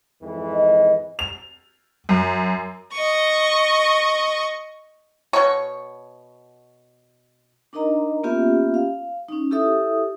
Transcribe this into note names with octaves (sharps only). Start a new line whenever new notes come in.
F2 G#2 E3
D#5
F7
F#2
D#5 C#6
B2 C#5
D4 D#4 A#4 D#5 A#5
A#3 B3 C#4 F4 G4 E5
F5
C#4 D#4
E4 G4 A4 E5 D#6